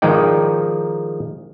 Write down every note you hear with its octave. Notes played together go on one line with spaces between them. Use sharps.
D#3 F3 G#3 D#4 D5 G5